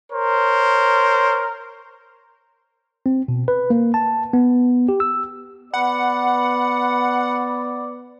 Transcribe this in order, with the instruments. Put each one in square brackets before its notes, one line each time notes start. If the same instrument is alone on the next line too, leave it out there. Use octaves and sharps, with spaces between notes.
[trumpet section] A#4 C5 C#5
[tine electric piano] C4
B2
B4
A#3
A5
B3
G4
E6
[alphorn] B3 [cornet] D5 [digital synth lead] F#5 [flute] B5